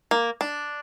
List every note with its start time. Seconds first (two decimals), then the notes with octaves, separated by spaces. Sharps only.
0.11 A#3
0.41 D4